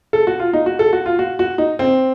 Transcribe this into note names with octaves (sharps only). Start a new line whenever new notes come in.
A4
F#4
F4
D#4
F#4
A4
F#4
F4
F#4
F#4
D#4
C4